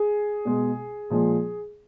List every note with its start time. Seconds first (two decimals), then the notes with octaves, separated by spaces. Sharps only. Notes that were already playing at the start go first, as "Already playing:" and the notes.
Already playing: G#4
0.45 B2 G#3
1.10 A#2 F3 G#3